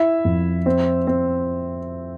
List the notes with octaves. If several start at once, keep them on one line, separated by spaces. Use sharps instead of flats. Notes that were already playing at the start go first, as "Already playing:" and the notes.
Already playing: E4 E5
F2
C4
C4